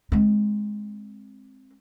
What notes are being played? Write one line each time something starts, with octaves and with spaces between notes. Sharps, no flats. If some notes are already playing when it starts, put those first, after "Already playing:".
G#3 C4